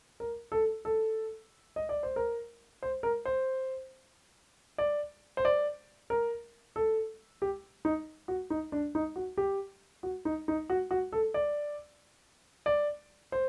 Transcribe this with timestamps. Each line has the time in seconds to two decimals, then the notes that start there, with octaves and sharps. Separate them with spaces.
0.20 A#4
0.52 A4
0.85 A4
1.76 D#5
1.89 D5
2.03 C5
2.16 A#4
2.83 C5
3.03 A#4
3.25 C5
4.78 D5
5.37 C5
5.45 D5
6.10 A#4
6.76 A4
7.42 G4
7.85 D#4
8.28 F#4
8.50 D#4
8.72 D4
8.95 D#4
9.16 F#4
9.38 G4
10.03 F#4
10.25 D#4
10.48 D#4
10.70 F#4
10.91 F#4
11.12 A4
11.34 D5
12.66 D5
13.32 C5